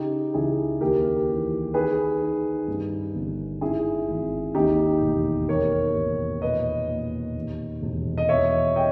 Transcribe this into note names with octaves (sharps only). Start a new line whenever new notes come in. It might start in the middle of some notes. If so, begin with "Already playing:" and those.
Already playing: C#3 D#4 G4
C#2 E4 G#4
D#2 G4 A#4
E3
D#3 G#4 B4
D#3
G2
G1
G#2 E4 G#4
G#1
D#2 D#4 G4
E1
D#2 A#4 C#5
E1
A#2 B4 D#5
A#2
D#2
E1
D#5
E2 C#5 E5
D#5 G5